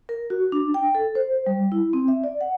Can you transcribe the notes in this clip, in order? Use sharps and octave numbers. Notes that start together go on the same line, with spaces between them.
A#4
F#4
D4
G5
A4
C5
G3
E4
C4
E5
D5
F#5